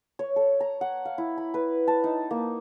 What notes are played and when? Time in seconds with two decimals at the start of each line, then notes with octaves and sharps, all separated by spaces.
0.19 C#5
0.36 A4
0.60 A#5
0.81 F#5
1.05 F5
1.18 E4
1.38 B5
1.54 B4
1.88 A5
2.04 D#4
2.31 A#3